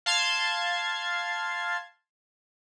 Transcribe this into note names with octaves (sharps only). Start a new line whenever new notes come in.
F5 A5 C6 G#6